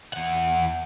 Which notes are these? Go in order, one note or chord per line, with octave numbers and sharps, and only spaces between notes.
E2 F#5